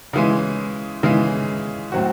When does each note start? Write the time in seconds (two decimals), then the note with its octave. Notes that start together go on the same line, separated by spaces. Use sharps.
0.13 C#3 E3 G#3
1.03 C#3 E3 G#3
1.92 A2 F#3 C4 F#4